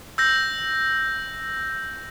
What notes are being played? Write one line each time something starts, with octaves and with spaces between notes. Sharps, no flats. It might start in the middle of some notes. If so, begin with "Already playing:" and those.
E6 G6 A#6